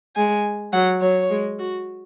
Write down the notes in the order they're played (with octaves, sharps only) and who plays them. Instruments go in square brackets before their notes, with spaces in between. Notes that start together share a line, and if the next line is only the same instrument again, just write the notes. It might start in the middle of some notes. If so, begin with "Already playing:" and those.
[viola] G#3 [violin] G#5
[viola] F#3 [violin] F#5
[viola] F#3 [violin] C#5
[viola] G#3
F#4